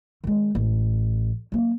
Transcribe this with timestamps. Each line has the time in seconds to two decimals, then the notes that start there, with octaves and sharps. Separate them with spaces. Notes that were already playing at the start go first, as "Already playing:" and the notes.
0.24 D#3 G#3
0.55 A1
1.52 F#3 A#3